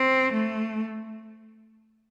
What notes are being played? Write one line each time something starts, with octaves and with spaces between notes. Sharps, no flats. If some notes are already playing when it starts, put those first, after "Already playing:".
Already playing: C4
A3